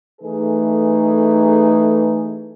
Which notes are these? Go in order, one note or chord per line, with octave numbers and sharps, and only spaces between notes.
E3 A3 D#4 G#4 A4 B4